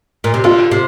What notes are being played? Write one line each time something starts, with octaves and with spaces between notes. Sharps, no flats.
A#2
C3
D3 F4
C3